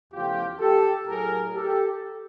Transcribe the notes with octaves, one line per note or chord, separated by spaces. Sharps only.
E2 C#3 F3 A3 F4 G4
G4 A4
A2 F#3 A3 G#4 A#4
G4 A4